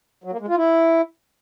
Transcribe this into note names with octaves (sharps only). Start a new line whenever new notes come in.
F#3
A#3
G#3
F4
E4